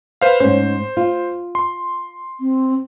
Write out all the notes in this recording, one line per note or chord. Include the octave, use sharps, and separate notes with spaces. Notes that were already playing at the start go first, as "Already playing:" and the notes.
B4 C5 F5
G#2 C#4 C5
F4
C6
C4